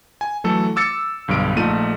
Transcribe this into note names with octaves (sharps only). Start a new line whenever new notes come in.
G#5
E3 F#3 A3 A4
D6 E6 A6 C#7
B1 G2 D3 D7
A#1 A3 D#4 F4 A4 D#7